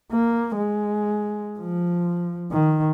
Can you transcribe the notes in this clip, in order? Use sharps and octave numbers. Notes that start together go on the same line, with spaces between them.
A#3
G#3
F3
D#3